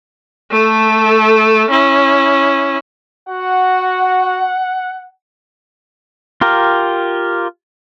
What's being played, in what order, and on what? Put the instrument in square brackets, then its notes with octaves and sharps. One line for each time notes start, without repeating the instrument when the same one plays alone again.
[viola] A3 A4
C#4 E4
[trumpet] F#4 [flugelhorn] F#5
[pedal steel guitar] F4 G4 A#4